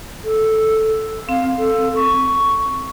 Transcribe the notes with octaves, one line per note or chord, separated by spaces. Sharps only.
A4
C4 F5
A4
C#6